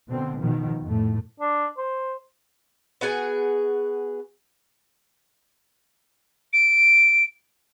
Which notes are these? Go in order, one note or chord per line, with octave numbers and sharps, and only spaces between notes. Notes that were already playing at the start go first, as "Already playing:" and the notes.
B2 D3 C4
B2 D#3 F3
F2 A2 A3
D4
C5
B3 F#4 G#4 G#5
D7